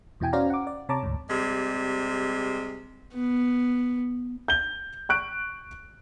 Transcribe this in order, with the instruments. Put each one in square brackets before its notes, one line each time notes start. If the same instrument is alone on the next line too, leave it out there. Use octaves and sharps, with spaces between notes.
[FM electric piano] E2 B2 E4 G5 G#5
C#4 F#4 C5 D5 F5 A#5
F#5 D6
D5
C3 C#5 A5 A#5 D6
D2 G#2
[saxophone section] C3 G3 G#3
[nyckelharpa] B3
[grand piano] G6 G7
C#6 F#6 D7